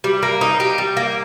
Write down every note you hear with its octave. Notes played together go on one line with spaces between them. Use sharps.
G3
A#3
D#4
G4
G3
A#3